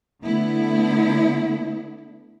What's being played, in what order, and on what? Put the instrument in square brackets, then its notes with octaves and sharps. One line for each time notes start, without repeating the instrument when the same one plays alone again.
[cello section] D3 A3 B3 E4